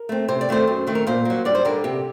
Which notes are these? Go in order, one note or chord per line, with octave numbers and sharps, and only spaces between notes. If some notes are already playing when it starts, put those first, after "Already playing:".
Already playing: A#4
A3 C4
C3 C5
D5
D#3 A3 C4 C5
F#2
D#3 A3 C4
A#4
A#2 C5
F#3 A#3
G2 D5
C5
D3 G3 A#4
C3 G4